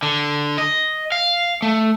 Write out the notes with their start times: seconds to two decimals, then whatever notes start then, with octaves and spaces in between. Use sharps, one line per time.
0.03 D3
0.58 D#5
1.12 F5
1.62 A3